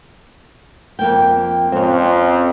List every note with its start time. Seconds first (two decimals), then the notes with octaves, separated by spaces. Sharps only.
0.99 F2 A#3 G5
1.72 F2 C4 C#4